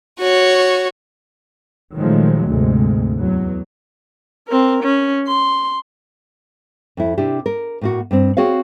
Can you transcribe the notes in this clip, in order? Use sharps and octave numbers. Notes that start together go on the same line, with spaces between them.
F#4 C#5
A#2 D#3 F3 F#3 G#3 A3
D2 G#2 C3 G#3
E2 F#3
C4 A#4
C#4
C6
F2 E4
C3 D4 E4 G4
A#4
A2 A#3 F#4
G2 C4
C4 F#4 G#4 C#5 F5